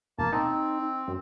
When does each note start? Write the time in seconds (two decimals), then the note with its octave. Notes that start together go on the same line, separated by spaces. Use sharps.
0.19 E1 A#3 A5
0.33 C4 D#4
1.08 F#2